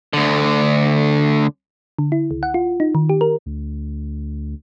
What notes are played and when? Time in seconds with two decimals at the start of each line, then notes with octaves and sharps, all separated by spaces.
0.13 D2 D3
1.99 D3
2.12 E4
2.31 C#2
2.43 F#5
2.54 F4
2.80 D#4
2.95 D#3
3.09 G4
3.21 A#4
3.46 D2